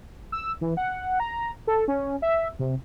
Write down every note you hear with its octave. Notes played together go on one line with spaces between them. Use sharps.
E6
E3
F#5
A#5
A4
C#4
E5
C3